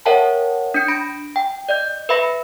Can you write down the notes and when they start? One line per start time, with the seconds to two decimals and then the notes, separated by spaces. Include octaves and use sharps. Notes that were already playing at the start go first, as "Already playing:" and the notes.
0.06 A#4 C#5 E5 F#5 G5 A5
0.74 D4 G6 C#7
0.88 B5 A#6 D7
1.36 G5
1.69 D5 D#5 G6
2.09 B4 E5 B5 A#6 C#7